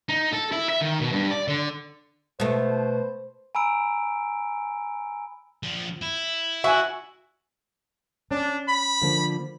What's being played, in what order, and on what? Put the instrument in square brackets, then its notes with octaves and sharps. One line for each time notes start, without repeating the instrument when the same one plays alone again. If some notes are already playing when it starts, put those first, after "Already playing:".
[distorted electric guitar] D#4
A4
E4
E5
D#3
B2
G2
D5
D3
[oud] B2 A3 [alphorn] C5
[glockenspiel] G#5 A#5 B5 E6 D7
[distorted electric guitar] F3 D4
E4
[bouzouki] F#4 [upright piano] E5 G#5
[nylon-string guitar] C#4 [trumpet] D4
[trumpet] B5
[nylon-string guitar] D3 F3 A#3